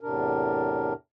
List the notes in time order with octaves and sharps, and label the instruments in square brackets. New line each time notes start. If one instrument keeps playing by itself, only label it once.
[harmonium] E2 A2 C3 D4 A#4